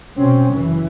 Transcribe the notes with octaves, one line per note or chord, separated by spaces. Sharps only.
B2 C4 C#4
F#1 E3